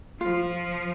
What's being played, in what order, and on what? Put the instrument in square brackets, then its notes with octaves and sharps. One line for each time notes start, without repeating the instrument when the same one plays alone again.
[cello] F3 [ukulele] F4